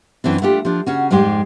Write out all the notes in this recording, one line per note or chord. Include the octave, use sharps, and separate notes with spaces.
F#2 E3 C4 D4
A3 D4 F4 G4
F3 D4
C#3 C#4 F#4
F2 G#2 G3 G#3 G4 G5